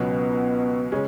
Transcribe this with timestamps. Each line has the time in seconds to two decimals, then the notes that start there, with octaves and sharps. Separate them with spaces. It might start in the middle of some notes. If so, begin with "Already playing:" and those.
Already playing: C#2 B2 F#3 B3 C#4
0.92 C#3 G#3 C#4